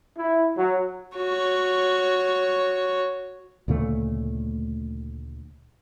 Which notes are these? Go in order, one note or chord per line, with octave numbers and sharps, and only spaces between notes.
E4
F#3
F#4 C#5
D2 A#2 C#3 A3